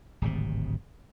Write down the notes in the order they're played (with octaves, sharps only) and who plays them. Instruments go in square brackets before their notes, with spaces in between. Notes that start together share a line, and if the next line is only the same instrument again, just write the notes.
[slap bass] D1 G#1 C3